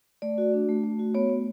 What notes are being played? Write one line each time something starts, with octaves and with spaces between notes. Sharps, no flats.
A3 D5
F#4
D4
A3
A3
F#4
B3 C#5
B3